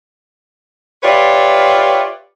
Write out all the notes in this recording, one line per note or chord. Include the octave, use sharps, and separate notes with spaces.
F4 G4 B4 C#5 D5 E5